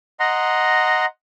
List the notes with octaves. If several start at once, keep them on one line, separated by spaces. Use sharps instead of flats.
D#5 F#5 A#5 C6